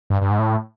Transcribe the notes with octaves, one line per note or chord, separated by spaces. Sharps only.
G2
G2
G#2
A2